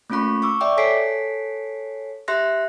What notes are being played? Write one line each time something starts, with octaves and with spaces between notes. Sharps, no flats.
A3 A#3 C#4 F4 B5 C#6
C#6 D6 E6
D5 E5 G5 D6
A4 C#5 G#5 B6 C7 D7
G4 E5 C6 F#6 A#6